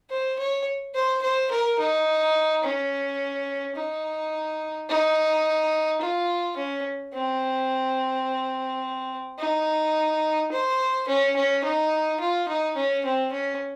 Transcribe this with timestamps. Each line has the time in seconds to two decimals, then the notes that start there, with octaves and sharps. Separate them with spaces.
0.10 C5
0.39 C#5
0.94 C5
1.22 C5
1.51 A#4
1.79 D#4
2.64 C#4
3.76 D#4
4.89 D#4
6.01 F4
6.57 C#4
7.14 C4
9.39 D#4
10.52 C5
11.08 C#4
11.36 C#4
11.63 D#4
12.20 F4
12.48 D#4
12.76 C#4
13.05 C4
13.32 C#4